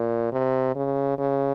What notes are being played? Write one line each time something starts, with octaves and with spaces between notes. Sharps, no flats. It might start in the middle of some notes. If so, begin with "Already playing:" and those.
Already playing: A#2
C3
C#3
C#3